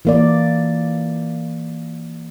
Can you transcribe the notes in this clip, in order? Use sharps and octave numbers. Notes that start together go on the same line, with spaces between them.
E3 A#3 D5